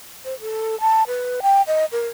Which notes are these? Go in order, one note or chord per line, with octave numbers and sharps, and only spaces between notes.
C5
A4
A5
B4
G5
D#5
A#4